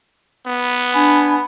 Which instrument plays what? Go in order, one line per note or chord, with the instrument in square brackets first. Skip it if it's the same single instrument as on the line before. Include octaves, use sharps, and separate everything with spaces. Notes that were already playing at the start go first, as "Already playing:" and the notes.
[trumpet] B3
[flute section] D4 G#5 B5